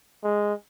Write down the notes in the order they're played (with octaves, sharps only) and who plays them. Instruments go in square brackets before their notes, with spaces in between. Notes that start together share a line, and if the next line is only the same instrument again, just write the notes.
[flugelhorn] G#3